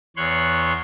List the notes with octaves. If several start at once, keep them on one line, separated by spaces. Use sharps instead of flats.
E2 C#5 C6 F#6